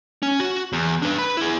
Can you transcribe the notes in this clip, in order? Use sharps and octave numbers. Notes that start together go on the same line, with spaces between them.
C#4
F#4
E2
D4 B4
B4 B5
E4 G#4